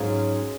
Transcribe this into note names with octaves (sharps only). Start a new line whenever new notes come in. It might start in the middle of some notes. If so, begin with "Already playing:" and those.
Already playing: G#2 F#3 C#4 F4 G#4 C#5